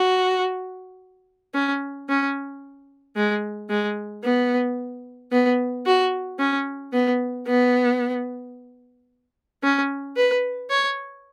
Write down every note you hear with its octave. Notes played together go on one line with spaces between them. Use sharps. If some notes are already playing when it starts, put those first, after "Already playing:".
Already playing: F#4
C#4
C#4
G#3
G#3
B3
B3
F#4
C#4
B3
B3
C#4
B4
C#5